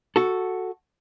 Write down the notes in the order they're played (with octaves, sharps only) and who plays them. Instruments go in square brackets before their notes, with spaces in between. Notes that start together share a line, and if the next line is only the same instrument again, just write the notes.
[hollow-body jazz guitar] F#4 A4